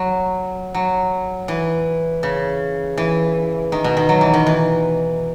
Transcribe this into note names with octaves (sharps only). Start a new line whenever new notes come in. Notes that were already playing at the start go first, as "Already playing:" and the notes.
Already playing: F#3
F#3
E3
C#3
E3
D#3
B2
D#3
F#3
E3
D#3
E3